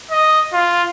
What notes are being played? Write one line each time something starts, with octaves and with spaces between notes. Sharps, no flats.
D#5
F4